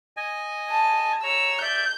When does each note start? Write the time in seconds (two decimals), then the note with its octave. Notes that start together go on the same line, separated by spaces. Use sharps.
0.17 D#5 G#5
0.71 A5
1.23 C#5 A#5 E6
1.62 D5 E5 G6